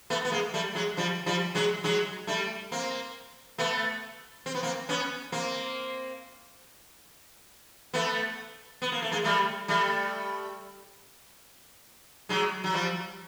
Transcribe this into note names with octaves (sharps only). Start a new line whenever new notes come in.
A3 B3
B3
G#3 A#3
G3 A3
F#3 G#3
F3 G3
F3 G3
F#3 G#3
F#3 G#3
G3 A3
A#3 C4
A3 B3
C4
B3
A#3 C4
B3 C#4
A#3 C4
A3 B3
B3
A#3
A3
G#3 A#3
G3 A3
G3 A3
F#3 G#3
F#3
F3 G3